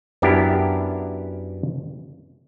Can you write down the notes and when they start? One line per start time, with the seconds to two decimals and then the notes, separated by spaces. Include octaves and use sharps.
0.22 F#2 B3 D4 E4 G4 A#4